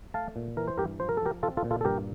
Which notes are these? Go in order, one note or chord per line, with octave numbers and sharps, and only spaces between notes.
A3 F5 A5
A#2
E3 A#4
C5
G2 G4 A#4
F3 C5
A#4
A4
F3 G4 A#4
C4 F4 A4
F4 A4
A#2
F4 A4
A4
G2 G4 A#4